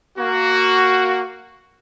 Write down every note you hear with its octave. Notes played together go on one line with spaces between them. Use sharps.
A#3 F#4